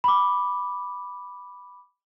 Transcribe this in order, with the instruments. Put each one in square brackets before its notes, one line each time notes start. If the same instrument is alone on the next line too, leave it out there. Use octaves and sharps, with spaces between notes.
[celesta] B5 D6